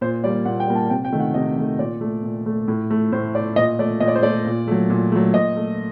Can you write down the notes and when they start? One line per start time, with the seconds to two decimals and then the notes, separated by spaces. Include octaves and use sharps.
0.01 A#2 C5
0.24 G3 A#3 D5
0.45 A#2 F#5
0.60 G5
0.68 G3 A#3
0.75 A5
0.90 C3 G5
1.05 G5
1.12 D#3 A3
1.19 F#5
1.34 C3 D#5
1.56 D#3 A3
1.79 A#2 D5
2.01 A3
2.23 A#2
2.46 A3
2.68 A2
2.90 A3
3.12 A2 C5
3.35 A3 D5
3.56 A#2 D#5
3.79 A3 D5
4.00 A#2 D#5
4.08 D5
4.15 C5
4.23 A3 D5
4.46 A#2
4.67 F#3 A3
4.90 A#2
5.12 F#3 A3
5.34 A#2 D#5
5.56 A3